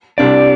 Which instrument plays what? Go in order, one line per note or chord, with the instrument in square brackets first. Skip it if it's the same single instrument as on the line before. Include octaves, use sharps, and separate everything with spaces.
[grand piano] C2 C3 G3 D4 [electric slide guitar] D5